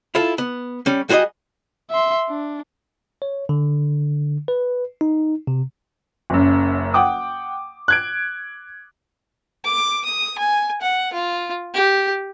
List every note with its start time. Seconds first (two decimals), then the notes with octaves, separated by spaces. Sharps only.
0.15 E4 F4 A4
0.38 B3
0.86 G3 C#4
1.09 G3 F#4 G#4 C5 D#5
1.91 E5 C6
2.28 D4
3.22 C#5
3.49 D3
4.48 B4
5.01 D#4
5.47 C3
6.30 F#1 F#2
6.94 F#5 G5 D6 D#6
7.88 F#6 G#6 D7
9.65 D6
10.06 D#6
10.38 G#5
10.81 F#5
11.13 F4
11.74 G4